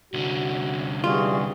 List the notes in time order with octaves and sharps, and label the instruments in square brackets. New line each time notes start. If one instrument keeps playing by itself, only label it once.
[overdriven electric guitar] C2 D3 [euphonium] F#4
[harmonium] E3 F#4 G#4 [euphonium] G3 [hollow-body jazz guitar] F4